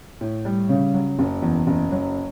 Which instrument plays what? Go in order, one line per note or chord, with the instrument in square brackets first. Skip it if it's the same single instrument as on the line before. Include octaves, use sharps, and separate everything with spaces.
[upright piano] A2
G3
C#3
F#3
F#1
E2
F#1
F#3